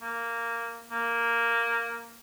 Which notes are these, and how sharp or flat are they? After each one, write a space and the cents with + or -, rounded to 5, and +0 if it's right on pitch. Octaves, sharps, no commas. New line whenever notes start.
A#3 -10
A#3 -5